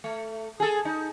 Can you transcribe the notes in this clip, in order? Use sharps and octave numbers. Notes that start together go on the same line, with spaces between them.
A3
G#4 A4
D#4